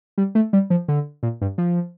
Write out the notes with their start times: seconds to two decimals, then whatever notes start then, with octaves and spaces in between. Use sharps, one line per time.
0.18 G3
0.35 A3
0.53 G3
0.70 F3
0.88 D3
1.23 A#2
1.42 G2
1.58 F3